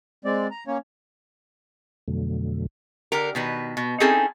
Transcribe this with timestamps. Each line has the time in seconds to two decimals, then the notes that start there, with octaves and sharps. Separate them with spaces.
0.25 G#3 C4 D5
0.51 A#5
0.67 A#3 C#4 C#5
2.08 F2 B2 D3 F#3 A3
3.12 D3 G4 A#4
3.35 B2 D#3 B4
3.77 B2
4.00 C4 C#4 D#4 E4 G#4 A4